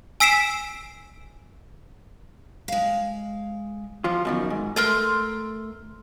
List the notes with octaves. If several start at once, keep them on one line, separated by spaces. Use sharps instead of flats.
G#5 E6 B6 C7 D7 E7
G#3 F5
F3 F4
F#2 B2 D#3
G#2
A3 A#4 C6 G6